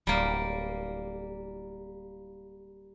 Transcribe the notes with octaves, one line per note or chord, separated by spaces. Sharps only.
D1 G3 A#3